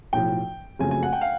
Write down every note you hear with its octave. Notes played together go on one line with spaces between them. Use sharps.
B1 A2 F3 G5
F#1 F2 C#3 F#3 A3 G#5
G#5
F#5
G5
F5